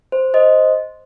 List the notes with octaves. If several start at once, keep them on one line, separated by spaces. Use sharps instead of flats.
C5
C5 D#5